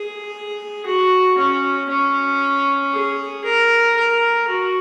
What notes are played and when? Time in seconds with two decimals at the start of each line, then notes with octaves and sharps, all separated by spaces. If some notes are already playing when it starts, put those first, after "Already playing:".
Already playing: G#4
0.86 F#4
1.38 C#4
1.89 C#4
2.93 G#4
3.44 A#4
3.96 A#4
4.48 F#4